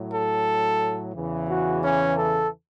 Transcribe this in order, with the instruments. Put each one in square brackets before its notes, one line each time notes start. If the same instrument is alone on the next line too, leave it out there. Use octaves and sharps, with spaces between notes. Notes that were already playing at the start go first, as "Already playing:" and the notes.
Already playing: [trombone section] A2 F#3
A4
E2 C#3 E3
F#4
C#4
A4